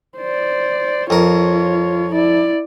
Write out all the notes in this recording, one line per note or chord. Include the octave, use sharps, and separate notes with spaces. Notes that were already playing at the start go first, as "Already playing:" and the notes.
C5 D5
F2 F4 A#4 C#5
E4 D5